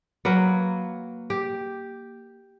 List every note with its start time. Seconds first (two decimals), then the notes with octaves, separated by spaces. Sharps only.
0.25 F#3 A#3 B4
1.30 G4